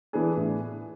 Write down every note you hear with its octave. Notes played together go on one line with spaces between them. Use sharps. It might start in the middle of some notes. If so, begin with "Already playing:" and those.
E3 B3 D4 G#4
A2